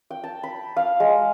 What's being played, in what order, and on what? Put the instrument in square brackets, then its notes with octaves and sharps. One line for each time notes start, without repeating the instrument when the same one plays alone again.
[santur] G5
A5
B5
F5
G#3